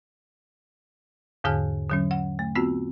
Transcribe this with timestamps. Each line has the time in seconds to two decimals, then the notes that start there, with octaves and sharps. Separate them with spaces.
1.44 E2 G#2 D3 G#4 G#5 F6
1.90 D3 F#3 C#4
2.11 F#5
2.39 A3
2.55 B3 C4 F4 F#4